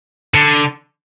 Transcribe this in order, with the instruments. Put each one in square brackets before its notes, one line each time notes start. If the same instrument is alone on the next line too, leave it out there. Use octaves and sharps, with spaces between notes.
[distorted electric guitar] D3